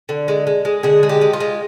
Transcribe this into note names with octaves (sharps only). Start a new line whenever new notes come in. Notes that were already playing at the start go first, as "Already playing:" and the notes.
D3
G#3
G#3
G#3
D3 G#4
G#3
G4
G#3
F4
G#3